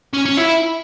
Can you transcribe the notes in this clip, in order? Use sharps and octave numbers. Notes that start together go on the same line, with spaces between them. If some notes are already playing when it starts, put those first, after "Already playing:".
C#4
C#4
E4